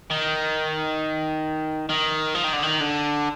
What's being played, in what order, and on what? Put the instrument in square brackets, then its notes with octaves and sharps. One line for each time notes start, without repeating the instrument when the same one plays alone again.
[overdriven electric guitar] D#3
D#3
F3
D#3
D3
D#3
D3